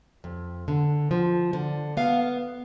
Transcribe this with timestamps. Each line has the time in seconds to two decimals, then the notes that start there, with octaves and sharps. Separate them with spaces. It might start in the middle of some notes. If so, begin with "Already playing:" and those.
0.24 F2
0.68 D3
1.11 F3
1.53 D3
1.97 B3 F5